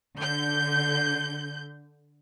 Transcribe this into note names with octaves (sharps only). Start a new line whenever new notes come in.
D3 G6